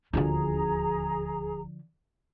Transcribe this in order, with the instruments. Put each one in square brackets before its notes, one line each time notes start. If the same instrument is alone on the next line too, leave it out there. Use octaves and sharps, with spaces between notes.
[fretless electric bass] D#1 D2 [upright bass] D3 F3 [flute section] G#4 A#5